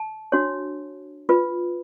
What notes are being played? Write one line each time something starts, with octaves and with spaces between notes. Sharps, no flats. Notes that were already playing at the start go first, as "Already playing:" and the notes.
Already playing: A5
D4 F#4 C#5
F4 B4